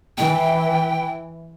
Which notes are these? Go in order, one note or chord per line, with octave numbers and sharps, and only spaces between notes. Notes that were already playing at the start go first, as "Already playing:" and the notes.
E3 G5